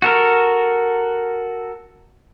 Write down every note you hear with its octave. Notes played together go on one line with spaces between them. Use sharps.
F#4 A4 A#4